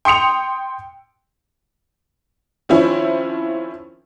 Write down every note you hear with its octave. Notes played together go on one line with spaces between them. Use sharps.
G5 C6 D#6 C#7 F7
D#3 F3 C4 C#4 E4